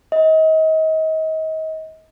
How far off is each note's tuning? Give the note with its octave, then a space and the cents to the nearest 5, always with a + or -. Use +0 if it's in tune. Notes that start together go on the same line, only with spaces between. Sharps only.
D#5 +30